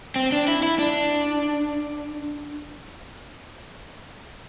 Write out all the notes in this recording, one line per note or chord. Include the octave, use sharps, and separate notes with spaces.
C4
D4
E4
E4
D4